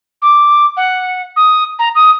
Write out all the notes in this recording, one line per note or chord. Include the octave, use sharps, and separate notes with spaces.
D6
F#5
D#6
A#5
D#6